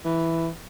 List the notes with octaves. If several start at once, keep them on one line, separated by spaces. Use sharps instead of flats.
E3